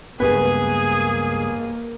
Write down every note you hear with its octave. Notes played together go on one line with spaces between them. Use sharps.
C#2 G2 A#3 B3 G#4 B4